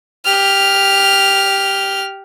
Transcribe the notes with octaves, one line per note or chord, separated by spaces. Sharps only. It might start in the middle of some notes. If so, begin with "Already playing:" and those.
G4 F6